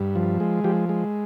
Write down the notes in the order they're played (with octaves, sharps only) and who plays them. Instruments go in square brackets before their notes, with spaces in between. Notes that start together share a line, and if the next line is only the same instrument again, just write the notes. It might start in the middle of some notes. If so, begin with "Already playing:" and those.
Already playing: [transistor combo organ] G2
F3
G#3
F3 G4
G#3